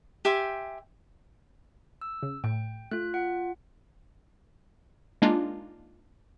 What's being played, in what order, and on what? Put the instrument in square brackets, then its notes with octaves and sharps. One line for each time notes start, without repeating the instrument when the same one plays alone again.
[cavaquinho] G4 E5 G#5 C6
[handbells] E6
[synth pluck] C#3
[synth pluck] A2 [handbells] G5
[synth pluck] A3 [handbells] F4 F#6
[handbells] F4 F#5
[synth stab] G#3 A#3 D4 D#4 F4